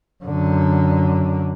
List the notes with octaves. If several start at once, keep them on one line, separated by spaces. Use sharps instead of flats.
F#2 D3